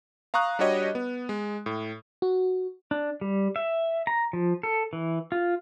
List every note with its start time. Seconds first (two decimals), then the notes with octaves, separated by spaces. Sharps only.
0.34 F5 A#5 C#6 D#6 F#6
0.59 G3 D4 F#4 G4 C#5 D#5
0.95 B3
1.29 G#3
1.66 A2
2.22 F#4
2.91 D4
3.21 G3
3.56 E5
4.07 A#5
4.33 F3
4.63 A4
4.93 E3
5.32 F4